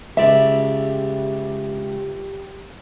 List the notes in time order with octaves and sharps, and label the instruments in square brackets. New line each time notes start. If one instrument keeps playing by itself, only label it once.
[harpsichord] C#2 D5 [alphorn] G4 [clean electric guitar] E5